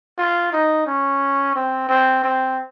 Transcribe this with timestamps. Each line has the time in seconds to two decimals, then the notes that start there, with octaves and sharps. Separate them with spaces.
0.18 F4
0.53 D#4
0.87 C#4
1.56 C4
1.89 C4
2.24 C4